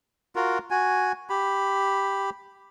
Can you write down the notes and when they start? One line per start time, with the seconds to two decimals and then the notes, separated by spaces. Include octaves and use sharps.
0.35 F4 F#4 A#4
0.70 F#4 G#5
1.30 G4 B5